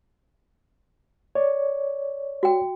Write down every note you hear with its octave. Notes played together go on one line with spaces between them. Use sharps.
C#5 D5
F#4 G5